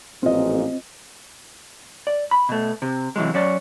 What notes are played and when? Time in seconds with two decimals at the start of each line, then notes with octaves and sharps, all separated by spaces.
0.23 A1 A#2 F3 C4 F4 D#5
2.07 D5
2.31 B5
2.49 B2 A3
2.82 C3
3.16 C3 E3 F#3 G#3
3.34 F#3 C#4 D5